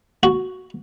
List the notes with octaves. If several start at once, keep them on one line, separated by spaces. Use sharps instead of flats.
F#4